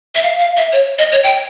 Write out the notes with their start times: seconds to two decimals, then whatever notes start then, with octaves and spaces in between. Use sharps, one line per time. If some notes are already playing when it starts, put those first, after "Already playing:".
0.15 E5
0.23 F5
0.39 F5
0.57 E5
0.73 C#5
0.98 D#5
1.12 C#5
1.23 G5